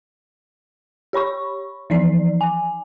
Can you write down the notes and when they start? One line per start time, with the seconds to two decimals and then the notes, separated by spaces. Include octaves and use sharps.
1.13 G4 C#5 B5 C#6
1.90 E3 F3 D#4 D5 C7
2.41 G#5